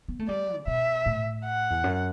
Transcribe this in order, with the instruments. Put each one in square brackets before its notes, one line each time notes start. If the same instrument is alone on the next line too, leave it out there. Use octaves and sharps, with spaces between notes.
[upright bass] B3
A3
[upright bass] G3 [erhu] D5
[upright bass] C3
[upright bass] B2 [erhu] E5
[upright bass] A2
[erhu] F#5
[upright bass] E2
F#2